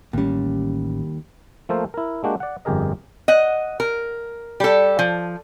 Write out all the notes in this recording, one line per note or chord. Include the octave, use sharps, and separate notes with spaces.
A1 D#2 G3 C#4
F3 A3 A#3 A4 A#4 C5
E4 A#4
G#3 A#3 D4 F#4 G4
D5 F#5
G1 F2 G4 G#4 A#4 D#5
D#5 F#5
A#4
G3 A4
F3